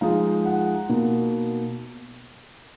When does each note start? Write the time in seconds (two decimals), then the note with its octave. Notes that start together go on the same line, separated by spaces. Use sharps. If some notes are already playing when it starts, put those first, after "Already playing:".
0.01 F3 G#3 D#4 F5
0.45 F#5
0.89 B2 A#3 D#4